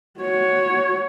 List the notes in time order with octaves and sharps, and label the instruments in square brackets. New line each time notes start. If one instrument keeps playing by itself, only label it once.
[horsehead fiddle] F#4 C#5